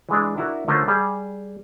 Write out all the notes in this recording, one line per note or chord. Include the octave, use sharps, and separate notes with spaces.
E3 G#3 D4
D4 E4 F#4 A#4
D3 A3 C#4 F4 A#4 C5
G3 G#4